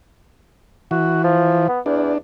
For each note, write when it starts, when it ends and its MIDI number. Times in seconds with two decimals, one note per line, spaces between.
0.91 1.68 52
0.91 1.20 66
1.24 1.65 53
1.68 1.80 59
1.86 2.14 40
1.86 2.18 62